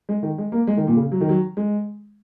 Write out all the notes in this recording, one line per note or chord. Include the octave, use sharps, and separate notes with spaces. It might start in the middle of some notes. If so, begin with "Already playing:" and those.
G#3
D#3
G#3
A#3
G#3
D#3
A#2
C#3
F#3
D#3
F#3
G#3